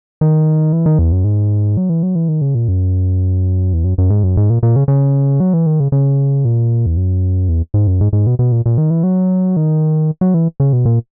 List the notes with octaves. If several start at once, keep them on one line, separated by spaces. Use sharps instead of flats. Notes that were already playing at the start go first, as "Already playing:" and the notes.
D#3
E3
D#3
E2
F#2
G#2
F#3
E3
F#3
E3
D#3
C#3
A#2
F#2
E2
F#2
F#2
G#2
F#2
G#2
A#2
A#2
C#3
C#3
F#3
E3
D#3
C#3
C#3
A#2
E2
F#2
E2
G#2
F#2
G#2
G#2
B2
B2
A#2
A#2
D#3
E3
F#3
D#3
F#3
E3
C#3
B2
A#2